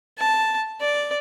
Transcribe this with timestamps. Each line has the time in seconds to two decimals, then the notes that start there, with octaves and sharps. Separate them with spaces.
0.19 A5
0.81 D5